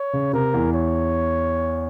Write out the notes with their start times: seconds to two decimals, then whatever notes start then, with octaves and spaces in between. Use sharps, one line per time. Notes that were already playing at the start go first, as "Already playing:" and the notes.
Already playing: C#5
0.13 C#3
0.33 C3 A#4
0.53 E2 E3
0.74 C#5